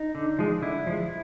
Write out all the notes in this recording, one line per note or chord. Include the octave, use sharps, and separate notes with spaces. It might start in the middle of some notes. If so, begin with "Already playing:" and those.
Already playing: D#4
D3
F3 G#3
D3 E4
F3 G#3